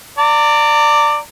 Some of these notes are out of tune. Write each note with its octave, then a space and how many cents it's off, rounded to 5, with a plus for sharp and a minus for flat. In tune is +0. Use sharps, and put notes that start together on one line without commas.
D5 +0 A#5 -40